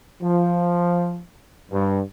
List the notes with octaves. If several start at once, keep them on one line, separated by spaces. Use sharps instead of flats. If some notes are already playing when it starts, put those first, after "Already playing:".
F3
G2